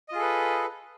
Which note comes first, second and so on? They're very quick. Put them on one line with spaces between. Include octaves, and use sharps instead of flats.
D#5 F4 G#4 A4 B4